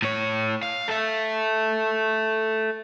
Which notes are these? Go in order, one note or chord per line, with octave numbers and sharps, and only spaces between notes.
A2 C#5
F5
A4 E5